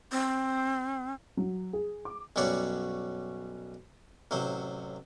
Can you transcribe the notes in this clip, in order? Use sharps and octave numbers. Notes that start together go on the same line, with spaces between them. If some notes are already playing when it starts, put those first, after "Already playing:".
C4
F#3
G#4
D6
B1 F#2 G3 F#4 C#5 D5
A1 C3 F#3 C5